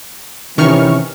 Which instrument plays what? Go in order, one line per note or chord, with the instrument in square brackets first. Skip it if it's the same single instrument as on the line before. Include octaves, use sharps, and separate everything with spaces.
[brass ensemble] C3 E3 C#4 [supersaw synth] D#3 C#6 F6